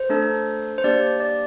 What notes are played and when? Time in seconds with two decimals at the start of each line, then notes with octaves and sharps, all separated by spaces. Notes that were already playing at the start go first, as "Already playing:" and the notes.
Already playing: C5
0.09 A3 D4 A4
0.78 C5
0.84 A#3 D4 G4 D5
1.20 D5